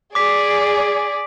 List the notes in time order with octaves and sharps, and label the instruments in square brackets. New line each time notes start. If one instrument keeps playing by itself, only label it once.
[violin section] G#4 D5 [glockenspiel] D6 B6